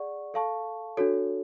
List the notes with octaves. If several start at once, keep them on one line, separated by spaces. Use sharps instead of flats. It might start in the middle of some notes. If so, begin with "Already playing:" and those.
Already playing: G#4 D5 F#5 C#6
A4 F5 A5 C#6
D4 F#4 A4 C#5